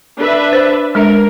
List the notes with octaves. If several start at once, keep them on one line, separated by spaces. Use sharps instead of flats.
D4 B4 E5
C5
G#3 D4 A#4 E5